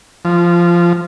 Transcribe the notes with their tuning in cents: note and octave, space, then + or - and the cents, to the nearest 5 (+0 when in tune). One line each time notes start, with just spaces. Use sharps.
F3 -15